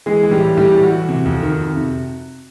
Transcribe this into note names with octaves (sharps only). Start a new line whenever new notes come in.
E3 G#3 G#4
E3
G3 G4
A2
A2 G3 G4
E3
F#4
E3
C3
F2
D#3
F2
C3